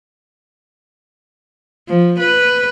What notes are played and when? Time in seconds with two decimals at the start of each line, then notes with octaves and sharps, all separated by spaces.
1.89 F3
2.20 B4